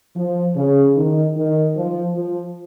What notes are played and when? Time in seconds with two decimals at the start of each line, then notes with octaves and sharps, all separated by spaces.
0.16 F3
0.56 C#3
0.96 D#3
1.36 D#3
1.76 F3
2.15 F3